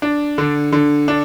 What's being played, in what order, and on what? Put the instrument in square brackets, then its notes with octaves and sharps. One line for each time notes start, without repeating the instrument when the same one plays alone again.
[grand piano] D4
D3
D3
D4